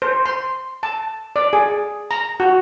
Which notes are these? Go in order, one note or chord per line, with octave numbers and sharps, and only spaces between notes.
C5
C6
A5
D5
G#4
A#5
F#4